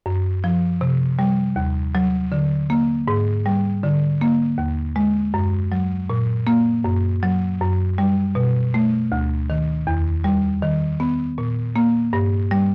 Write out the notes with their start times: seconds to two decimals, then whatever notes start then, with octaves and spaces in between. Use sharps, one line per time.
0.06 F#2
0.44 F3
0.81 C3
1.19 G3
1.56 D#2
1.95 F#3
2.32 D3
2.70 A#3
3.08 G#2
3.46 G3
3.83 D3
4.21 A#3
4.58 D#2
4.96 G#3
5.34 F#2
5.72 F#3
6.10 A#2
6.47 A#3
6.84 F#2
7.23 F#3
7.61 F#2
7.98 G3
8.35 B2
8.74 A3
9.12 D2
9.50 D#3
9.87 E2
10.24 G3
10.62 D#3
11.00 B3
11.38 A#2
11.76 A#3
12.13 G2
12.51 G3